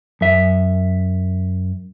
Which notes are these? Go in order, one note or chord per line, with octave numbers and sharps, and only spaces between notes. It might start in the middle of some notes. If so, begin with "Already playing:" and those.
F#2 E5